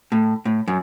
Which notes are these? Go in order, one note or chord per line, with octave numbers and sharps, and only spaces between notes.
A2
A2
F#2